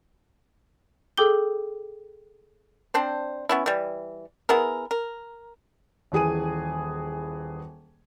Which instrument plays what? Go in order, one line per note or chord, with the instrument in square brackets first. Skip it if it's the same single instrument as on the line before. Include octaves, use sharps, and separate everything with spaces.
[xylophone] G#4 A4 G5 D6 G6 G7
[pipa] C4 D4 C5
B3 C#4 E4
E3 G3
B3 E4 G#4 A#4
A#4
[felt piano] D#1 E3 G#4 G#5 D#7